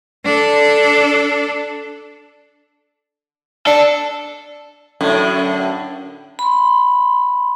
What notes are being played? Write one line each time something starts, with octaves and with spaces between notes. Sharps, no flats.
D4 A4
D4 A4
F#2 A2 D3
B5 C6